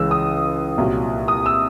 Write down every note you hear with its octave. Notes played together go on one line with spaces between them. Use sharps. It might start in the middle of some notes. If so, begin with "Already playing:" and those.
Already playing: C#2 C#3 E3 E6
D#6
C2 A#2 F#3
D#6
E6